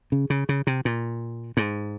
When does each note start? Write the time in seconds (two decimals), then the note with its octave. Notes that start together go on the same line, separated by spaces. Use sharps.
0.12 C#3
0.30 C#3
0.49 C#3
0.67 C3
0.85 A#2
1.57 G#2